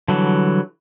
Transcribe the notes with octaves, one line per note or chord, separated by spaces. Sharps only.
D3 E3 F#3 G3